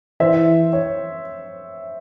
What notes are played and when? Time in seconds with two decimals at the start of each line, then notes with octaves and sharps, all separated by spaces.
0.20 E3 C5 E5
0.73 C#5